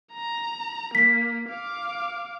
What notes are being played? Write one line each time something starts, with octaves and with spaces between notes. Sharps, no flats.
A#5
A#3 B6
F5 D6